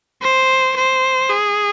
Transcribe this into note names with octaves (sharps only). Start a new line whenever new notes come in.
C5
C5
G#4